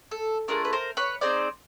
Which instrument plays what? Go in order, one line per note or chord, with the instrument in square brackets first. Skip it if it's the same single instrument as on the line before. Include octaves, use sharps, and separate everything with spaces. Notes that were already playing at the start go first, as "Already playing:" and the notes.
[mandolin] A4
A3 D4 F4 G#4 A#4
B4
A#4 C5
B4 C#5
C4 D#4 G#4 C5 D5